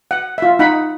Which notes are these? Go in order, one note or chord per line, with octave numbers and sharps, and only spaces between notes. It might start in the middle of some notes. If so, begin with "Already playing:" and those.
F#5
F4 E5
D#4 F#5 B5